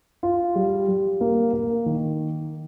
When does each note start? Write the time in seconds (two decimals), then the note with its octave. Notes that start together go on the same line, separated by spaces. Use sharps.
0.23 F4
0.55 G3
0.88 G3
1.21 A#3
1.53 A#3
1.86 D#3